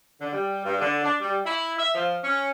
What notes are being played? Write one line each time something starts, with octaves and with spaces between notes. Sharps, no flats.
D3
G3
G2
D3
D4
G3
E4
E5
F3
C#4